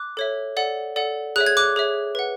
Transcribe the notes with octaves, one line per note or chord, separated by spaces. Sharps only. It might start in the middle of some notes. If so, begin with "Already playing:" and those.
Already playing: D6 F#6
A4 C#5 E5
A4 D5 F#5
A4 D5 F#5
G#4 C#5 E5 F#6
G#6
D6 F#6
G#4 C#5 E5
B4 F#5